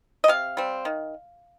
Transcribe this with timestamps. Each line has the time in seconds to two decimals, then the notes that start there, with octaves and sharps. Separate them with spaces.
0.24 D#5
0.28 C3 F5
0.57 G3 C4
0.85 D#3